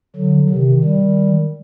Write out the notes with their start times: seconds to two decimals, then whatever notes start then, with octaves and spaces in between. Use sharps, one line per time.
0.16 D3 F#3
0.49 C3 D#3
0.83 D#3 G3